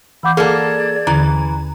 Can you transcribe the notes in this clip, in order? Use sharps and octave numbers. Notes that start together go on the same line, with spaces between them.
E3 F5 F#5 B5 D6 G6
A#3 G#4 A4 D5 G#6
D#2 D3 E3 A#5